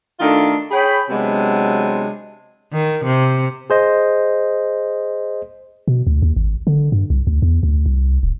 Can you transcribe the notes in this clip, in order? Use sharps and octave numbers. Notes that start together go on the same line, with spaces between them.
D#3 A3 D4 F4 A4
G#4 C#5 G5 B5
C3 F#3 G#3 B3 C4 D4
D#3
C3
G#4 C5 D#5
B2
D2
D#2
G#1
D3
G2
C2
D2
E2
D2
C2
D1